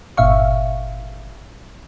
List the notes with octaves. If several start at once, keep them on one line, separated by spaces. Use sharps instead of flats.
G1 A#2 E5 F5 C#6